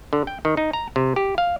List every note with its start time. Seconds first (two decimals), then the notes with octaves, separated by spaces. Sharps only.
0.13 D3
0.27 G5
0.45 D#3
0.57 D#4
0.73 A#5
0.96 C3
1.16 G4
1.38 F5